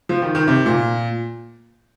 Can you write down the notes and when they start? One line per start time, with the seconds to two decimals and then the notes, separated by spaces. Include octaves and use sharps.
0.09 F3
0.22 D#3
0.35 D#3
0.47 C3
0.66 A#2